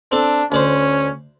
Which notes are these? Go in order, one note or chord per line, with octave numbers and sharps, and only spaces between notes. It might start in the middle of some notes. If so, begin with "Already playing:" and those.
C4 D4 A4
D2 C#4 D4 C5